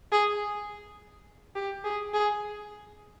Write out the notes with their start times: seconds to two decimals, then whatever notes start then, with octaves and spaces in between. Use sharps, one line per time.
0.12 G#4
1.55 G4
1.84 G#4
2.14 G#4